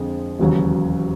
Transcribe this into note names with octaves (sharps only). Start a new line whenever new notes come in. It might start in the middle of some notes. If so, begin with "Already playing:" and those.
Already playing: F2 D3 F3 G#3
E1 D#2 C#3 F#3